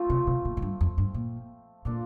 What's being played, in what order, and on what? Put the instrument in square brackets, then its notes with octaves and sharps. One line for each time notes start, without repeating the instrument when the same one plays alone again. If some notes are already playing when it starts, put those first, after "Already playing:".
Already playing: [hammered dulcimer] F3 A3 C4 F4
[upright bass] C3
C3
A#2
A2
G2
F2
G2
A#2
[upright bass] A#2 [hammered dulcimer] F3 A#3 D4 A4